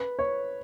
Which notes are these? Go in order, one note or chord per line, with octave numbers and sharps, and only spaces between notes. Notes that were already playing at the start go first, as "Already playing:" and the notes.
Already playing: B4
C#5